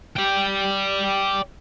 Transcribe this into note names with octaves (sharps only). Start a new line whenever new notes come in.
D5 G5